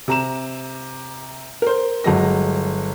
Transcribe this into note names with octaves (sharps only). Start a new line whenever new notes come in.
C3 A#5 E7
A#4 C5
G1 F#3 G#3 A#6